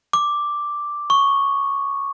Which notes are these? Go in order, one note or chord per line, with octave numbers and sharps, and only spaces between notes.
D6
C#6